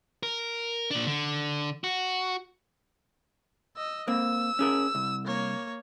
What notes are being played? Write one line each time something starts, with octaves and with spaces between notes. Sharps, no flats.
A#4
A#2 D4
D3
F#4
D#5 E6
A#3 C4 E6
C#4 G#4 A#4
C2
A#3 C#5